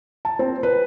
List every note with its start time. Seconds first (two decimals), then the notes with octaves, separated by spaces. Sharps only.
0.25 A5
0.39 C4
0.63 B4